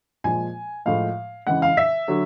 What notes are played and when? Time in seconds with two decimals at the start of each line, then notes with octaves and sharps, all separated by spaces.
0.24 A#2 F3 G#3 G#5
0.85 A2 F3 G#3 F5
1.47 C#3 E3 G#3 F#5
1.62 F5
1.77 E5
2.08 D3 F#3